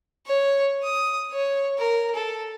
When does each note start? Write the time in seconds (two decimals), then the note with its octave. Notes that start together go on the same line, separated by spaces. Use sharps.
0.26 C#5
0.83 D#6
1.32 C#5
1.78 A#4
2.15 A4